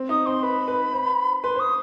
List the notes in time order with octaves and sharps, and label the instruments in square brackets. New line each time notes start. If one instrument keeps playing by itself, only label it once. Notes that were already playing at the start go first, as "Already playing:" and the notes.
Already playing: [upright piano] C4
[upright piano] D#4 [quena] D#6
[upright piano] C4 [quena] C6
[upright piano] B4 [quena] B5
[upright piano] B4
C5
[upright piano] B4 [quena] C6
[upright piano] C5 [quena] D#6